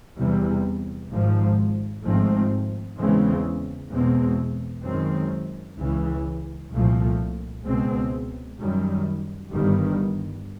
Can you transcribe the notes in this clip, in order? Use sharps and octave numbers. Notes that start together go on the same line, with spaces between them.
E2 C3 E3 G3
G#1 G#2 F3
G#1 G#2 F3 A3 C4
E2 C#3 E3 G#3 C4
E2 B2 G#3 C4
F#2 D#3 G#3 C4
C#2 C#3 E3
C2 A#2 F3 A3
C#2 B2 G#3 C4
F#2 D#3 G3
G1 G2 D#3 G3